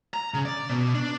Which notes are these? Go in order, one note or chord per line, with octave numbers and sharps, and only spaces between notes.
A#5
C#3
D5
B2
D4